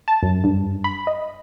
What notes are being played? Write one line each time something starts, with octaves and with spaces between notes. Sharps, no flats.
A5
F#2
G2
B5
D#5